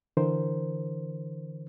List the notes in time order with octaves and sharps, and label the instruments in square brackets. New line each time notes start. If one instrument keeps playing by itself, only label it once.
[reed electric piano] D3 E3 A#4 C5